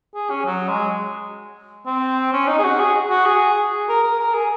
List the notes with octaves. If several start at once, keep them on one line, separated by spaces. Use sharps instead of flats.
G#4
C#4
F#3
G#3
C4
C#4
D#4
G#4
F#4
G#4
F#4
G#4
A#4
A#4
A#4
G#4